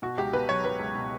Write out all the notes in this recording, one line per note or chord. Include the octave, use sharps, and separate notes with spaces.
B2 F#4
C#2 G4
B2 B4
F#3 C#5
F#3 B4
C#2
B2